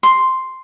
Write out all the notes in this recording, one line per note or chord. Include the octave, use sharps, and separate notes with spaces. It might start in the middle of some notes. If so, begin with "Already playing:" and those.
C6